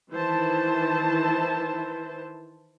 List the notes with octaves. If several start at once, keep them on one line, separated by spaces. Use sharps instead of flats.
D#3 E3 E4 B4 C5 A5